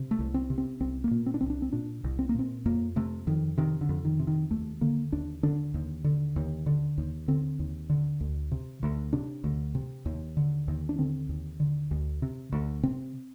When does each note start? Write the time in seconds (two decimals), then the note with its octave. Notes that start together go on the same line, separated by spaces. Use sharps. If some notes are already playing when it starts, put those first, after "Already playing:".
Already playing: C3
0.11 A3
0.19 C2
0.34 C4
0.50 C3
0.58 C4
0.80 C2 C4
1.04 A#3
1.11 A#2
1.26 C4
1.34 D4
1.41 C2 C4
1.50 D4
1.62 C4
1.73 A#2 D4
2.04 C2
2.19 C4
2.29 A#3
2.35 A#2 C4
2.66 F2 A#3
2.96 C3 A3
3.27 F2 D#3
3.58 C3 D#3
3.81 D3
3.89 F2
4.05 D#3
4.19 C3
4.27 D#3
4.51 D#2 A3
4.81 D3 A#3
5.12 D#2 D4
5.43 D3 D4
5.74 D#2
6.04 D3
6.36 D#2
6.66 D3
6.98 D#2
7.28 D3 C4
7.59 D#2
7.90 D3
8.20 D2
8.51 C3
8.83 D2
9.13 C3 D4
9.44 D2
9.75 C3
10.05 D#2
10.37 D3
10.68 D#2
10.89 D4
10.98 D3 C4
11.29 D#2
11.60 D3
11.91 D2
12.22 C3
12.52 D2
12.83 C3 C4